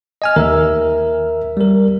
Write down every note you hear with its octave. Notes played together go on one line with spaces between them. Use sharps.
D#5 G#5 F6
D#2 A#4 E5 E6
G3 A#4